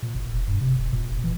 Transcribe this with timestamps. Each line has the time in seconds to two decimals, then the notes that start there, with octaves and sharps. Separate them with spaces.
0.02 A#2
0.15 G1
0.30 E1
0.48 G2
0.61 C3
0.78 D#1
0.93 A#2
1.11 F1
1.24 E3